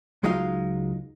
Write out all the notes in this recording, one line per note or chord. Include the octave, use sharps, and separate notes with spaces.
C#2 F#3 G#3 D#4 F4 F5